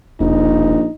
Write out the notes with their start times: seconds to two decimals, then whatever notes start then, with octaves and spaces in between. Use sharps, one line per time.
0.20 E1 A#1 D#4